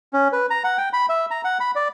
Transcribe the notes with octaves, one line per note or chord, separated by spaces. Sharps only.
C#4
B4
A#5
F#5
G5
B5
E5
A#5
F#5
B5
D5